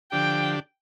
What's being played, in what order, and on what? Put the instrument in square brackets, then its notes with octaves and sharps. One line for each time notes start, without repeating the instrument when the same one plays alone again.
[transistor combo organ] D3 F3 D4 G4 [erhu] G5